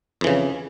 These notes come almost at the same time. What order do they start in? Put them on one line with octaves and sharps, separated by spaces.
F2 E3 C#3